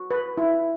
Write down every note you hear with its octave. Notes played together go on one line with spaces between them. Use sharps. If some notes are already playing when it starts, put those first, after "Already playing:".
Already playing: F#4
B4
E4